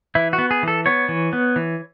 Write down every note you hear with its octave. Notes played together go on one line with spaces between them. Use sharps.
E3 E4
F#4
B3
G#4
E3 A4
B3 C#5
E3
B3
E3